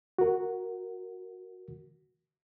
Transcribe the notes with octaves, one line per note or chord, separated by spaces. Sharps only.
F#4 A#4